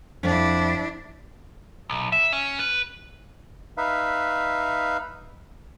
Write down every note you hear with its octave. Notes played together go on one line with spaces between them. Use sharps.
F2 D4 E4
B1
E5
C#4
B4
D#4 B4 E5 F5